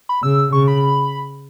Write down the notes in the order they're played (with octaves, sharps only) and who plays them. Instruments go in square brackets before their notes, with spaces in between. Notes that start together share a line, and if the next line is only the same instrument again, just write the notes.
[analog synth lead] B5
[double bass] C#3 [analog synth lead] E6
[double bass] C#3 [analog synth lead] C#6
[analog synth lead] B5